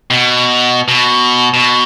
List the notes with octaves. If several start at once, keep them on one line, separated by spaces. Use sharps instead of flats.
B2
B2
B2